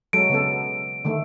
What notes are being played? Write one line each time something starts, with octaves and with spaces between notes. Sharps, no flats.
F#3 G#3 A4 D7
C#3 B3 A4
D3 D#3 A3